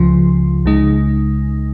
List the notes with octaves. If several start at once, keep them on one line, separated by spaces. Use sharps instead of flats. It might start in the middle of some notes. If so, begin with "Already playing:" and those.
Already playing: C#2 C#3 F3 F4
C#2 C#3 G#3 D#4